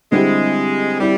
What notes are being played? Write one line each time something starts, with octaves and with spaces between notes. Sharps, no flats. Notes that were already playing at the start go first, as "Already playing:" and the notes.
D3 G3 G#3 C4 E4 G4
G3 E4 G4